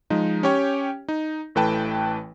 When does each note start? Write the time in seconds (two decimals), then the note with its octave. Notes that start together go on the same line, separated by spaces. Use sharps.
0.10 F3 G#3 D#4
0.43 C#4 G4 C#5 G5
1.08 D#4
1.55 A1 E3 A3 B4 G5 A5